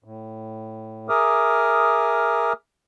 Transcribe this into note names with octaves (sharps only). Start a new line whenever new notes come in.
A2
G#4 A#4 E5 D6 D#6 F6